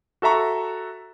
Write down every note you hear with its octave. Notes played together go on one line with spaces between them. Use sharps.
F#4 A4 E5 A#5 C#6